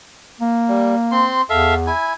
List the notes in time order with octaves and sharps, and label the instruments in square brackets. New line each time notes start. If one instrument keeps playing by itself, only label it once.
[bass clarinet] A#3
[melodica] G3
C4 C6
[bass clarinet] E2 [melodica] A4 E5 F5
[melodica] E4 G#5